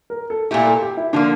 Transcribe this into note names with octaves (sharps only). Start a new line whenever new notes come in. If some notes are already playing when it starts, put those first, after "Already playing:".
A#4
A4
A#2 A3 E4 G4
A4
G4
E4
D3 F3 A#3 D4